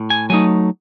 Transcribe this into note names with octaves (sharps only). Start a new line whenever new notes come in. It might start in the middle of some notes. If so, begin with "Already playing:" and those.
Already playing: A2
G#5
F#3 A3 D#4 G#5